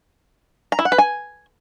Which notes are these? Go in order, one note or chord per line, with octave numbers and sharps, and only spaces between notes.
A#5
E4
F#5
B4
G#5